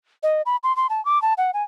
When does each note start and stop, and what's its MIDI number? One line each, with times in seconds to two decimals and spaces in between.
0.23 0.42 75
0.46 0.56 83
0.63 0.75 84
0.77 0.87 84
0.90 1.03 81
1.05 1.21 86
1.22 1.34 81
1.38 1.51 78
1.54 1.63 80